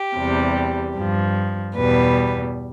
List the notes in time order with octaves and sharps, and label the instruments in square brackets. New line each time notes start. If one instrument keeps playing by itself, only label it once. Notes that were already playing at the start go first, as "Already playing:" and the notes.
Already playing: [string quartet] G4
E2 C3 G3
G2 F3
E2 B2 G3 B4